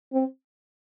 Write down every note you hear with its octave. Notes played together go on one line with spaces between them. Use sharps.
C4